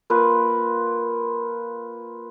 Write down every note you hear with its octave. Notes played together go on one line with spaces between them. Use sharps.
A#3 F4 B4